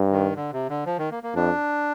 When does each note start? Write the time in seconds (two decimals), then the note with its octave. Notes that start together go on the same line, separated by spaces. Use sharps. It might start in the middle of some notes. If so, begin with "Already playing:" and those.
Already playing: G2
0.11 D#3
0.36 D3
0.53 C3
0.69 D3
0.86 F3
0.98 D#3
1.11 A#3
1.23 A#3
1.35 F2 D4